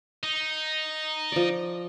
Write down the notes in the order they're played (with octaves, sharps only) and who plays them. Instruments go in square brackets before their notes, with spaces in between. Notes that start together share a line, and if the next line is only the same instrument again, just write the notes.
[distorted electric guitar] D#4
[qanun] F3 D5